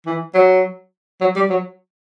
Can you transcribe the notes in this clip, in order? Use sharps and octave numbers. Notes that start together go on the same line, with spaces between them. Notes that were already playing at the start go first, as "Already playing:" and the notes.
E3
F#3
F#3
G3
F#3